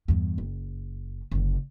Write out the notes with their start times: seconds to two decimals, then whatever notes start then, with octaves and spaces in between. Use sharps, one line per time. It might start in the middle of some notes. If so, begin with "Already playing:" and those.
0.08 E2 G2
0.38 F#1
1.32 F#1 D3